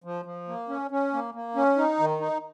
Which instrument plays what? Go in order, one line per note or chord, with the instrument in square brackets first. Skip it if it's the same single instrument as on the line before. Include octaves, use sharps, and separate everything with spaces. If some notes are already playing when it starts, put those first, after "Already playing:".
[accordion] F3
F3
A#3
C#4
C#4
A#3
A#3
C#4
D#4
D#3
D#4